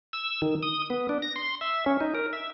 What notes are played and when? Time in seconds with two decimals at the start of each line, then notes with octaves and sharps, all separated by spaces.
0.13 E6
0.42 D#3
0.63 D#6
0.90 B3
1.09 D4
1.22 A#6
1.36 C6
1.61 E5
1.86 C#4
2.01 D#4
2.15 A#4
2.33 E5